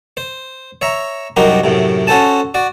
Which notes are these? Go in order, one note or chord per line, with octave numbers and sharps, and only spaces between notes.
C5
C#5 E5 A#5
C2 F#2 D#4 F#4 G4 A#4
F#2 A2 C3
C#4 F#4 A4 C5 G#5 A5
F#4 D5